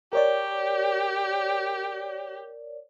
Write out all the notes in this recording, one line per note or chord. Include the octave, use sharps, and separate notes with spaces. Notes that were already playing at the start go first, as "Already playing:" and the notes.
G4 A#4 C#5 D5